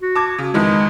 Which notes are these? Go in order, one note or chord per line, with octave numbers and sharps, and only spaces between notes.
F#4
A5 D6 G#6
C#3
F2 D#3 E3 G#3